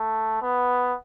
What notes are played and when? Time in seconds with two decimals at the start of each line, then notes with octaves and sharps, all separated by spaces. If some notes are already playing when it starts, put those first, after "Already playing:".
Already playing: A3
0.42 B3